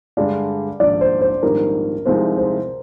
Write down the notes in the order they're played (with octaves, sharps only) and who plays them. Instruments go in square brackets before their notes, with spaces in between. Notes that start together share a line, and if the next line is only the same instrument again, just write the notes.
[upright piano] G2 D3 G#3 [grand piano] D5
[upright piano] A#1 G#2 D#3 [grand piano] D5
[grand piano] C5
C5
[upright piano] A#1 G#2 D#3 G3 C4 [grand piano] A#4
[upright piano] C2 C3 F3 G#3 D#4 [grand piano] C5
[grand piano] C5